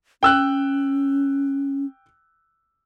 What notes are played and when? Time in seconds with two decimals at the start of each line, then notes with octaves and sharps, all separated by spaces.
0.23 C#4 G5 E6 F#6